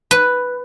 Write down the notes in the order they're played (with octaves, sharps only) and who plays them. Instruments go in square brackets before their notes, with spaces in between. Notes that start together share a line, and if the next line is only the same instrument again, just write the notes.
[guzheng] B4